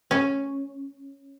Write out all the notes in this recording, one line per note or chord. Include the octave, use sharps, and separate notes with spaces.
C#4